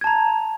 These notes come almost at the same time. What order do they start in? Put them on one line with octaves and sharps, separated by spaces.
G#6 A5 A#5